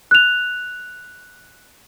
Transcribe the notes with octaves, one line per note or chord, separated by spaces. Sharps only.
F#6 F7